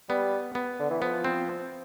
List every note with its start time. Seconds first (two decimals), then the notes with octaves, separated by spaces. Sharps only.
0.09 G3 B3
0.55 B3
0.80 D3
0.90 E3
1.01 F3 B3
1.24 C4